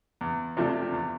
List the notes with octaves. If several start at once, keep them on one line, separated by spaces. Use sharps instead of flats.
E2
C3 F3 A3 D4
E2